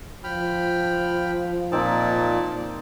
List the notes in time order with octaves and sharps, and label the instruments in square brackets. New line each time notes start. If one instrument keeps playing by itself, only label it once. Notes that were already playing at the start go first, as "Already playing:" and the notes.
[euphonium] F3 [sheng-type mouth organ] G5 B5 F6
[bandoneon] A#2 [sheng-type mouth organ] A#3 D5 A5 [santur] C4 D#4